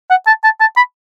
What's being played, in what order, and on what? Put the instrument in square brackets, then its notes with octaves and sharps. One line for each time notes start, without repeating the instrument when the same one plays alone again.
[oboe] F#5
A5
A5
A5
B5